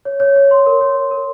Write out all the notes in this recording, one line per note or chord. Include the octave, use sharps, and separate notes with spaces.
C#5
C#5
C#5
C6
A#4
C#5
C#5
A#4